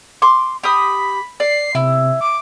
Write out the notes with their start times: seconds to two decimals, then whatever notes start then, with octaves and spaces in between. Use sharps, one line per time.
0.22 C6 D6
0.64 G4 B5 D#6
1.40 D5 C7
1.75 C3 E4
2.21 D6